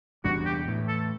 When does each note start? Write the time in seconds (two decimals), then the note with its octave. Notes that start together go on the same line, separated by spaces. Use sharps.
0.24 E2 C3 G3 D4 F#4
0.46 G4
0.67 A2 E3 A3
0.89 A4